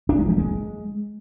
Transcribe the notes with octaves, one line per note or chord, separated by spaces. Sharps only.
D4
G#3
F3
G#3